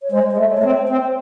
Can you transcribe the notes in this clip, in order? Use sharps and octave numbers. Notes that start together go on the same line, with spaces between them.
C#5
G#3 C5
G#3
A3
C#5
A3
C4
C4